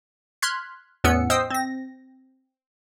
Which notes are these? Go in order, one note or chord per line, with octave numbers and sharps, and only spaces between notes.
C6 F6 F#6 G#6 B6
E2 A2 B3 C#4 E6 C#7
C5 D#5 G5 D#6 E6 C7
C4 A#6